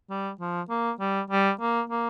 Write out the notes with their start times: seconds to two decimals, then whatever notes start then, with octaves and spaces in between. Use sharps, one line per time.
0.10 G3
0.40 F3
0.70 A#3
1.00 G3
1.30 G3
1.61 A#3
1.90 A#3